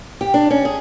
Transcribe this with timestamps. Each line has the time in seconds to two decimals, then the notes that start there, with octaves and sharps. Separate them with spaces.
0.21 G4
0.34 D4
0.50 C#4
0.65 G#4